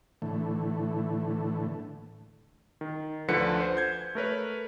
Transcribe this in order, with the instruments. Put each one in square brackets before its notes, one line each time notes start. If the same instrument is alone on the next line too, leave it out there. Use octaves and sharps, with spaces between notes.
[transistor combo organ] A2 D3 E3 A3
[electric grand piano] D#3
D2 D3 F3 B4 C#7
C5
G6 G#6
A3 A#4 B4 C#5